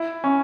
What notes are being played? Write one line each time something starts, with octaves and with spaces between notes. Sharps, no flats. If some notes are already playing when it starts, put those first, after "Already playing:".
Already playing: E4
C#4